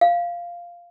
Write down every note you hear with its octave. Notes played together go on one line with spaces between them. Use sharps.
F5